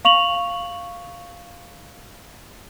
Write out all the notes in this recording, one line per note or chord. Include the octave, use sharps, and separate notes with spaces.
F5 C#6 F7 F#7